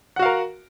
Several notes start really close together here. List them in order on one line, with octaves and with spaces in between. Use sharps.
F#5 F#4 F5 A#4